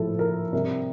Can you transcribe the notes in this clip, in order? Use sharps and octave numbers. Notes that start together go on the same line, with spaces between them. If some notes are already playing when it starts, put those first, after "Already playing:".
Already playing: A2 F3 A4
A#4
C3 G3 A#4